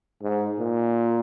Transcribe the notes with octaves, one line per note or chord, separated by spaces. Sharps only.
G#2
A#2